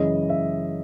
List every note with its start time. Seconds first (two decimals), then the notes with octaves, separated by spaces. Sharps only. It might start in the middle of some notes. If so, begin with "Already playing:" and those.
Already playing: F#2 C#3 E3 G#3 D#5
0.30 E5